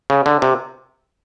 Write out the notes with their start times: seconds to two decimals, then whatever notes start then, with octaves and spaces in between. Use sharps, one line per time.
0.10 C#3
0.26 D3
0.42 C3